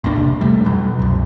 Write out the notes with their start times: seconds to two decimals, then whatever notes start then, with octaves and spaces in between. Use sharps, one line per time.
0.04 A1 E2 A#3 D4
0.18 C3
0.41 F2 G3 A3
0.65 B2 F#3
0.99 C2 F#2